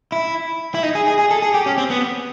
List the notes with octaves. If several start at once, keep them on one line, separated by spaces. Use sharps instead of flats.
E4
E4
D#4
G#4
G#4
G#4
A4
G#4
G4
C#4
C4
B3